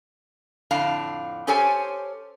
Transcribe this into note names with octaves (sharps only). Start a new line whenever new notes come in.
F2 A2 D3 F5 A5
C#4 G4 A4 C5 C#5 G#5